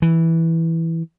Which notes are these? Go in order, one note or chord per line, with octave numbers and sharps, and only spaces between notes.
E3